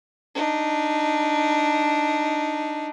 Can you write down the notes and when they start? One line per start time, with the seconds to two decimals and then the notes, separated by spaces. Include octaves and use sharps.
0.35 D4 D#4